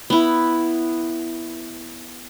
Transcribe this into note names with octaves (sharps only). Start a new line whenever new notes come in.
B3 E4